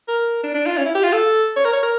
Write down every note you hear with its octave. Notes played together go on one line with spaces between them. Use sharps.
A#4
D4
D4
F4
C#4
E4
G4
F4
A4
C#5
A#4
C#5
A#4